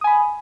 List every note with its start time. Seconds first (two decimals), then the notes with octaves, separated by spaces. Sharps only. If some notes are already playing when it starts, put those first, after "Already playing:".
0.01 D#6
0.04 G#5
0.07 B5